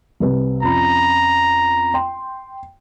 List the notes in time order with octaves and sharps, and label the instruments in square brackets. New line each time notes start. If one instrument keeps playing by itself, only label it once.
[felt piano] C2 C3 B4
[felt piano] F2 C#4 B5 [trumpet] A#5
[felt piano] G5 C6